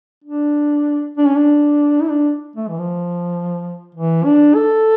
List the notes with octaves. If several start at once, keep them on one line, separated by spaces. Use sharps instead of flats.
D4
D4
C#4
D4
E4
D4
A3
E3
F3
E3
D4
A4